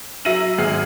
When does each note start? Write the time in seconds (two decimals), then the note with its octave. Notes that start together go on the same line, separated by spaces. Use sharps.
0.25 F#3 E5 A#6 D#7 F#7
0.58 G#1 G#4 F6 C7 F#7